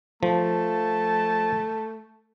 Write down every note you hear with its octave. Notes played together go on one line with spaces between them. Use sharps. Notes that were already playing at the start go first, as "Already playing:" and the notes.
F3 A3 A5